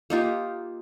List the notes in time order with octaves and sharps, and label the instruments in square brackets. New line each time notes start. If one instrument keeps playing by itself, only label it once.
[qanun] A#3 D#4 F4 G4